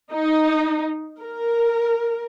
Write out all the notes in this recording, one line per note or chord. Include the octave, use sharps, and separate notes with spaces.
D#4
A#4